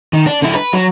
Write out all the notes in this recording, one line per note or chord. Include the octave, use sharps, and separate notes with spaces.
D#3
D4
D3 E4
B4
F#3